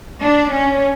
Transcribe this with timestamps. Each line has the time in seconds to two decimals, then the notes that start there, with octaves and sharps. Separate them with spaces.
0.23 D4
0.55 C#4